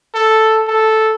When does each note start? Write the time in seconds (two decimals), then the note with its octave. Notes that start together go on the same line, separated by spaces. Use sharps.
0.14 A4
0.67 A4